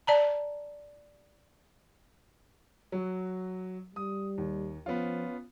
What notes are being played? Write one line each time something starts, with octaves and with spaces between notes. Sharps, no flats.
D5 A5 A#5
F#3 F#4
G3 D#6
D#2
F3 B3 C#4 F4